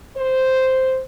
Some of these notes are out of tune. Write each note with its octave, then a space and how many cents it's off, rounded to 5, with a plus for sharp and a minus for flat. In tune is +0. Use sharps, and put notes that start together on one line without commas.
C5 -5